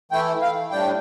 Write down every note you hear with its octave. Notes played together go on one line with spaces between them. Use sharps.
E3 A3 E4 G5
F5
A2 G3 D4 G5